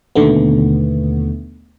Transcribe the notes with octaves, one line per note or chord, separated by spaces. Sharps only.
D#2 B2 D3 D#3 A3 B3